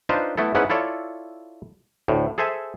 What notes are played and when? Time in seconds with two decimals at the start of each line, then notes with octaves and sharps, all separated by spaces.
0.09 D4 D#4 F4 B4 C5
0.38 A3 B3 E4 A4
0.55 G#2 B3 C#4 E4 B4 F#5
0.70 E4 F4 A4 C#5 D5
2.08 D2 A2
2.38 G#4 A4 C5 E5 G#5